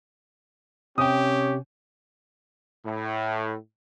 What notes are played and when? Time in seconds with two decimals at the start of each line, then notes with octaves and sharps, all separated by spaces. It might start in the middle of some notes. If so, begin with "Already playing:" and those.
0.98 C3 C#4 G4 G5 D#6
2.85 A2